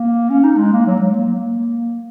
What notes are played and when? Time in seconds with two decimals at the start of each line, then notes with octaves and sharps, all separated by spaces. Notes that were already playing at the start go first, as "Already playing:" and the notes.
Already playing: A#3
0.30 C#4
0.44 D#4
0.58 G#3
0.73 A#3
0.86 F#3
1.00 G#3
1.14 A#3
1.36 A#3